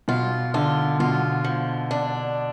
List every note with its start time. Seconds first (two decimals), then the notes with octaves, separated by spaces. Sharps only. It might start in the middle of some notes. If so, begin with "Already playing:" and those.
0.08 B2 F4
0.54 D3 F4
1.00 B2 F4
1.44 F3
1.91 D4